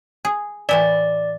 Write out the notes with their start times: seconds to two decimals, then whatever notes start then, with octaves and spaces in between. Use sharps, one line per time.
0.25 G#4
0.69 A2 E3 E4 D5